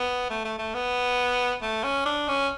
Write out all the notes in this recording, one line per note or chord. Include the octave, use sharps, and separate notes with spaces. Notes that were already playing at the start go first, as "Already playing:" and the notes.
Already playing: B3
A3
A3
A3
B3
A3
C#4
D4
C#4